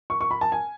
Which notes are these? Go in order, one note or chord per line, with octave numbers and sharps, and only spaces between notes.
C#6
C#6
B5
A5
G#5